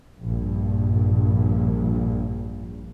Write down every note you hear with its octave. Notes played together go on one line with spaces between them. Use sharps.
A#1 G2